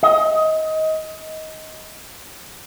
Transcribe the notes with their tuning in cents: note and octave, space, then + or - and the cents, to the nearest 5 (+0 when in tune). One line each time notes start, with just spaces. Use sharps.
D#5 +20